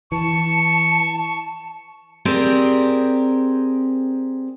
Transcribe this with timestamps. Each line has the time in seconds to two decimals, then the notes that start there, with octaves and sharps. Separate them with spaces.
0.12 E3 A5 C#6
2.25 C4 G4 G#4 A#4 C5 D5